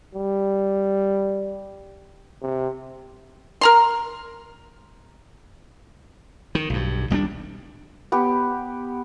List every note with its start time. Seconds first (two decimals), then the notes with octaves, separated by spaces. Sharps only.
0.15 G3
2.42 C3
3.61 A#4 A#5 C6
6.55 D#3
6.70 B1 G2
7.10 D#1 G3 A#3 D4
8.12 B3 G4